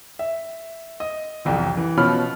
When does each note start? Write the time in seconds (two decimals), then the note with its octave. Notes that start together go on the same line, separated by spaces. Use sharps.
0.19 E5
1.00 D#5
1.45 E1 C2 F2
1.77 E3
1.97 B2 F3 C#4 B5 F6